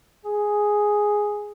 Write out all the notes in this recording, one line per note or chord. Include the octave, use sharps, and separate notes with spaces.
G#4